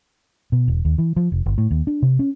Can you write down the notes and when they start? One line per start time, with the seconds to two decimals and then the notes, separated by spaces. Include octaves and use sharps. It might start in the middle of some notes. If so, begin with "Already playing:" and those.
0.52 B2
0.68 E1
0.85 D#2
0.98 E3
1.16 F3
1.32 F1
1.46 G1
1.58 A2
1.71 D#2
1.87 D4
2.02 C3
2.19 C#4